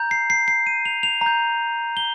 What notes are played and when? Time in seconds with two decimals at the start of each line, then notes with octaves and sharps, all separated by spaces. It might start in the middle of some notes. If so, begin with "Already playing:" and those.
Already playing: A#5 G6
0.11 C7
0.30 C7
0.48 C7
0.67 D#7
0.85 F7
1.03 F7
1.21 A#5 G6
1.97 G7